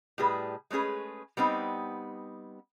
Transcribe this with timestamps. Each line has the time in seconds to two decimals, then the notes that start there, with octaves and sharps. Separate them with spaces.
0.18 A2 G3 G#4 B4
0.71 G#3 A3 C#4 G#4 B4
1.37 G3 B3 C4 D#4